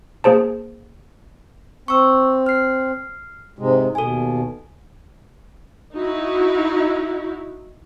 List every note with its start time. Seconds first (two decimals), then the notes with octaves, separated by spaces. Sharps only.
0.24 A#3 G#4 C5 A5
1.88 C4 C#6 E6
2.46 F6 C7
3.59 G#2 C3 G#3
3.95 D#2 B2 A4 G#5
5.96 D#4 E4 F#4